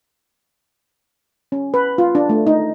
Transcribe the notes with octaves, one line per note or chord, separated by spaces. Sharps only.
C#4
B4
F4
D4
A3
D#4